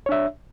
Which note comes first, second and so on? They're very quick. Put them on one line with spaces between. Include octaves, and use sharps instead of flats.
C#5 D4 E5